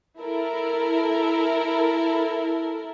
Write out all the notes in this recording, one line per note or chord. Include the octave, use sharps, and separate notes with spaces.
E4 A4 A#4